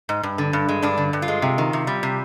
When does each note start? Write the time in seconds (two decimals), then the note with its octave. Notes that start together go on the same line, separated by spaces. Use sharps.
0.09 G#2
0.23 G2
0.38 D3
0.53 G2
0.68 G#3
0.82 G2 D4
0.98 D3
1.13 G2
1.22 F4
1.28 G#3
1.42 C3
1.58 D#3
1.73 C3
1.87 G3
2.03 C3